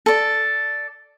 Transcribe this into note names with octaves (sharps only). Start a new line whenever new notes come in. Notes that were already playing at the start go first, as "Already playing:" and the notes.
A4 D5